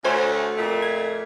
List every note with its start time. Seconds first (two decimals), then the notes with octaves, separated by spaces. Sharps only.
0.04 D2 A3 C5 C#5 G#5
0.57 F2 A#2 A3
0.82 G#6